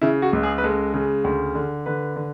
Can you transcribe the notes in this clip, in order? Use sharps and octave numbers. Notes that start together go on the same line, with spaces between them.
C#3 E4
F#4
C#2
G#4
B4
G#3 A4
C#3
D2
D3
D3 B4
D3